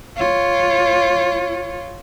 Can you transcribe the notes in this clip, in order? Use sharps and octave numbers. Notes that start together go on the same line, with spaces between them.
F4 C#5